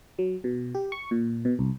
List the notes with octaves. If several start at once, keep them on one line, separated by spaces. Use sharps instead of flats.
F#3
B2
G4
C#6
A#2
B2
C2